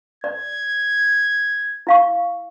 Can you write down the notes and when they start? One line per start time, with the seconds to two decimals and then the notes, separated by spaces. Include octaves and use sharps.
0.24 D5 G#6
1.87 E4 F5 C#6